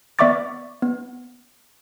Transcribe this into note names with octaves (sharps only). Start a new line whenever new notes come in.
B3 D5 E5 C#6 D6 A6
B3